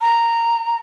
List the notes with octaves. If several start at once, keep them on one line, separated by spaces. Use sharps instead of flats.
A#5